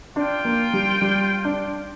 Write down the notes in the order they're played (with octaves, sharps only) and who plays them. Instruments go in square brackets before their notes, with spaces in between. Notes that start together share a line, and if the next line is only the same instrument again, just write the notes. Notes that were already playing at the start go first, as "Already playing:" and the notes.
[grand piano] D4 [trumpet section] F4 C5 G5
[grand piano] A#3
G3
G3
D4